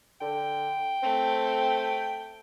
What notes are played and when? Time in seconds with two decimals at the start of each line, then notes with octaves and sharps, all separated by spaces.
0.21 D3 G5
1.03 A3 C4